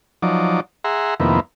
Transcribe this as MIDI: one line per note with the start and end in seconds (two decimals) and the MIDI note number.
0.22 0.60 53
0.22 0.60 54
0.22 0.60 63
0.22 0.60 74
0.84 1.14 68
0.84 1.14 76
0.84 1.14 78
0.84 1.14 82
0.84 1.14 84
1.20 1.40 41
1.20 1.40 48
1.20 1.40 51
1.20 1.40 58
1.20 1.40 59
1.20 1.40 64